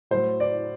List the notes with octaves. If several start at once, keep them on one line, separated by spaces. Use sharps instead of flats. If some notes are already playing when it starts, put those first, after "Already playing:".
A2 F#3 C5
D5